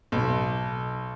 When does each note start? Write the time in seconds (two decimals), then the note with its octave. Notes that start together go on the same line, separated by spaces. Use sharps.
0.12 B1